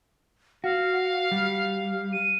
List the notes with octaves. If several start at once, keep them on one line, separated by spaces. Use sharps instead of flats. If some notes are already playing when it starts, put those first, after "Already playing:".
F#4 F5
G3
D#7